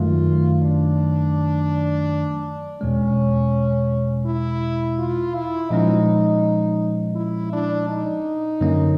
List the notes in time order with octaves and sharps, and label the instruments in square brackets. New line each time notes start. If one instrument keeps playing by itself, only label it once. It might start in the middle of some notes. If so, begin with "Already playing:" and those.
Already playing: [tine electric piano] F#2 D#3 F#3 A3 [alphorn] F4
[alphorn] D4
[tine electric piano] E2 B2 G#3 [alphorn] C#4
[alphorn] E4
F4
E4
[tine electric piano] A#2 F3 G#3 C#4 [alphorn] D#4
[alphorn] E4
D4
D#4
[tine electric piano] F#2 D3 F#3 A#3 C#4